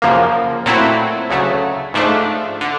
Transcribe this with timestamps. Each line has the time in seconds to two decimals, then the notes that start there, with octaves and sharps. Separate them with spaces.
0.02 F#2 C#3 F3 A#3
0.66 A#2 F#3 A3 C4 E4
1.30 D2 C#3 F#3 A3
1.94 G#2 F3 A3 D4
2.61 D3